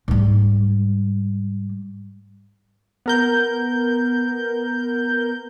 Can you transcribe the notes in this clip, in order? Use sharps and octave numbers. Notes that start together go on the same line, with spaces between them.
G#2 G3
B3 A#4 G6